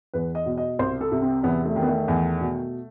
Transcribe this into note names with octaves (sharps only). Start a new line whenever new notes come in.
E2 B4
D#5
B2
D#5
C2 C5
A4
C3
C4
E2 B3
A3
D#3
B3
A3
E2
B2